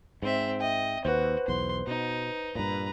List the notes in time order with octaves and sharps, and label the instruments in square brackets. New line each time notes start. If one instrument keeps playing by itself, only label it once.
[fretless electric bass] G#2 [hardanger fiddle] C4 E5
[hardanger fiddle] D#5 [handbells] E5 G5
[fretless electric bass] D#2 [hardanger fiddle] F#4 [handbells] B4 C5
[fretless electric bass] B1 E2 [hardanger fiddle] C6
[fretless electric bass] B2 [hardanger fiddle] D#4
[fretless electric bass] G2 A#2 [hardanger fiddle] B4 A#5